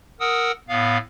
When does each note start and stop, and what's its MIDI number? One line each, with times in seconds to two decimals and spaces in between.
0.20 0.52 70
0.20 0.52 78
0.20 0.52 87
0.20 0.52 88
0.69 0.98 45
0.69 0.98 59
0.69 0.98 77